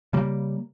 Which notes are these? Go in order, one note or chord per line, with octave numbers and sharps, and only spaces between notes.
C#3 G3 A#3